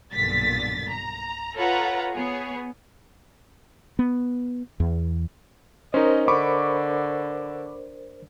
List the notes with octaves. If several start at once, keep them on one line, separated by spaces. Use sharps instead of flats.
B1 G2 A#2 D3 A6 B6
A#5
F4 A4 B4 C#5 F#5 A#5
B3 G#4 C#5
B3
E2
C#4 D#4 A#4 C5 D#5
D3 B5 C#6 D6